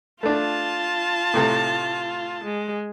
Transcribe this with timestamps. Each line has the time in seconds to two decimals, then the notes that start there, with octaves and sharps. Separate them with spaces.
0.23 A3 D4 F4 A5
1.34 A2 C3 A3
2.44 G#3